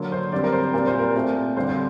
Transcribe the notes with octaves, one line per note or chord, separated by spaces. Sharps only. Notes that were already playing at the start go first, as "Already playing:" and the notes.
Already playing: D3 F#3 A#3
C5
D3 G3 C4 D5
A#4
C5
A#2 G3 C4 A#4
C5
A#4
A#2 A3 C4
G2 D3 G3 C4 C5
C5